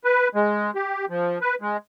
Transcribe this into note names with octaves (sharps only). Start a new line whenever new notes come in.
B4
G#3
G4
F3
B4
G#3